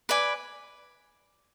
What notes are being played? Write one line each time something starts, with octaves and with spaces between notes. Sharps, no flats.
B4 D5 G#5